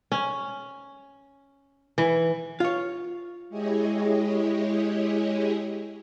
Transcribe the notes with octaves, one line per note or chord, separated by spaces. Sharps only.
C#4
E3
F4 C#5
G#3 E4 G4 G#4 C#5 D#5